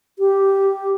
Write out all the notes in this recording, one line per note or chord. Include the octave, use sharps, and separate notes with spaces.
G4